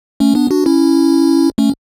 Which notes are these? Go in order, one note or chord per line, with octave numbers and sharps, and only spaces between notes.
A3 C#4
B3 D4
D4 F#4
C#4 E4
A3 C#4